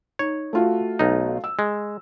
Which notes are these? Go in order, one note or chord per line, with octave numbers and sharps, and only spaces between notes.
D#4 C#5
A3 F4 F#4
B1 D#4
E6
G#3